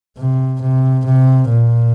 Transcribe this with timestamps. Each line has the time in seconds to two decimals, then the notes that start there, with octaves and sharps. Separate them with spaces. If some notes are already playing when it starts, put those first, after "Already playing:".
0.18 C3
0.61 C3
1.05 C3
1.49 A#2